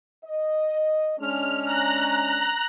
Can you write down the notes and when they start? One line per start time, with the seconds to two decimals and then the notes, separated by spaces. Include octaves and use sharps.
0.25 D#5
1.19 G#3 C#4 D4 F6
1.65 A#5 F#6